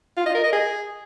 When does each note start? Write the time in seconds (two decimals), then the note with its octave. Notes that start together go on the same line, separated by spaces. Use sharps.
0.17 F4
0.26 D#5
0.35 A#4
0.43 D#5
0.52 G#4